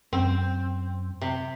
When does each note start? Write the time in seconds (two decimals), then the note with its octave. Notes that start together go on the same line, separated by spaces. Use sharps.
0.13 F#2 C4
1.21 C3